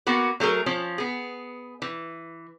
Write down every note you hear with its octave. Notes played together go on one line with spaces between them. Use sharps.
A#3 B3 F#4 B4
F#3 A3 G#4 A#4
F3 C#4
B3 G#4
E3